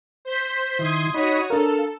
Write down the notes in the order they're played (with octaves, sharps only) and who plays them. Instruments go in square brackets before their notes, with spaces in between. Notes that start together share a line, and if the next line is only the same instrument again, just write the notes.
[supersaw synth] C5 G6 B6
[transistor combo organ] D#3 E4 [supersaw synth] C6 D#6 G#6
[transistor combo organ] D#4 D#5 B5 [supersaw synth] F#4 C#5 D#6
[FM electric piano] D4 A#4 [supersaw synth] A4 [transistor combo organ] F5